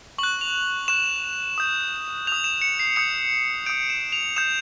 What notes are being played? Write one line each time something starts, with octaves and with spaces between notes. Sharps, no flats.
C#6 F#6 F#7
F7
C#6 F#6 E7
D#6 G6
D#6 G6 F7
E7
C#7
C7
D#6 G6 C#7
D#6 G6 D7
E7
F7
D#6 G6 E7